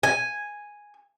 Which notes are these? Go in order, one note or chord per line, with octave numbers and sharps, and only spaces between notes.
G#5